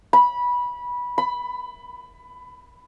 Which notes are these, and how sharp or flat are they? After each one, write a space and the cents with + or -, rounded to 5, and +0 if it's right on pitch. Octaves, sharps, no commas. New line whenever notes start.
B5 -15
B5 +20